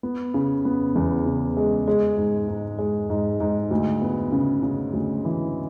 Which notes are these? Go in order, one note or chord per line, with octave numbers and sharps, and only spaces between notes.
B3
C#3
B3
E2
C#3
G#3
G#3
G#2
G#2
G#3
G#2
G#2
D2
B3
C#3
C#3
D2
E3